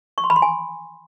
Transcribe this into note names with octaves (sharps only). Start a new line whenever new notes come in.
C#6
C6
B5
C6
G#5